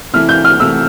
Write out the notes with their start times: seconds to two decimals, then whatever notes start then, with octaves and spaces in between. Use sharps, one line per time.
0.13 C3 E3 A3 E4 F6
0.29 G6
0.44 F6
0.59 C3 E3 A3 E4 E6